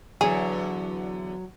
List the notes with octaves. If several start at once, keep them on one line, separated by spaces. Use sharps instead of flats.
E2 D3 F#3 G#4